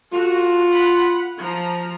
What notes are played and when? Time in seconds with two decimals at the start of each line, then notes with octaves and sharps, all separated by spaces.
0.13 F4 F#4 A4
0.73 F#5 B5
1.40 F3 A#5